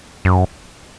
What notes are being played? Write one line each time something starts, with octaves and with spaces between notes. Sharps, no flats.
F#2